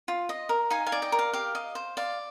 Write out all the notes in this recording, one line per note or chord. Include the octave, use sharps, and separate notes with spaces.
F4
D#5
A#4
D#4 F5 G#5
F5 G#5
D5
D#5 G5
A#4
F5
G4 F5
D#5
C5
D5 F5